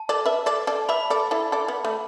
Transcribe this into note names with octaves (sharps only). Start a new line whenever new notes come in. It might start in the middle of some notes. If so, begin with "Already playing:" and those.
Already playing: A5
A4 D5
B4 E5
A4 D5
A4 D5
B4 E5 B5
A4 D5
E4 A4
A4 D5
B3
A3